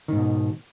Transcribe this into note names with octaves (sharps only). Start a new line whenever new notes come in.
G#2 B2 D#3